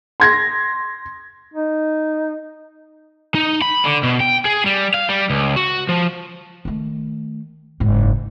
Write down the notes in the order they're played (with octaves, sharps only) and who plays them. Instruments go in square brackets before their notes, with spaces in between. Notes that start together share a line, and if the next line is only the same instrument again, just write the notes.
[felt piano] C6 G#6 A#6
[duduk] D#4
[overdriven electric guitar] D#4
B5
D3
B2
G5
G#4
G3
F5
G3
C#2
F#4
F3
[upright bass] D#3 A3
F#1 G#2